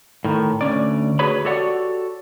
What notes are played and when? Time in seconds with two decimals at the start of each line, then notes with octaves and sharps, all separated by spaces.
0.25 A2 D#3
0.61 D2 B2 C#4 D5
1.19 D2 F#4 G#4 B4 C#5 B5
1.45 F#4 G4 A4 C#5 D5 F#5